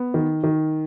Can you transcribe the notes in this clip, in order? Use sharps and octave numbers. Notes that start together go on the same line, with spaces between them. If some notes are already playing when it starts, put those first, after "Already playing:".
Already playing: B3
D#3
D#3